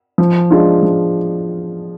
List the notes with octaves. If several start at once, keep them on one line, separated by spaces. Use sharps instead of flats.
F3
G#3 D4 F4
F3